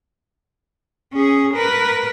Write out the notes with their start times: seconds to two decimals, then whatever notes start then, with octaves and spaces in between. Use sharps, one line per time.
1.13 C#4 G#4
1.54 A#4 B4